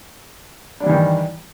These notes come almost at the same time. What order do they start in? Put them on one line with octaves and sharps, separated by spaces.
D4 G3 E3 D#3